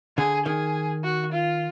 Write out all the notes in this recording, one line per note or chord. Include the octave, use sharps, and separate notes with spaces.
D3 G#4
D#3 G#4
F#4
F4